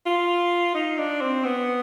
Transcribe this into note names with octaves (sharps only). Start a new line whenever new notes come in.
F4
D#4
D4
C4
B3